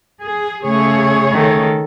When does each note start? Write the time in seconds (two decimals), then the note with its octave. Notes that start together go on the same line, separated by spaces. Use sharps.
0.23 G#4
0.64 C#3 A3 G#4 C#5
1.33 D#3 A4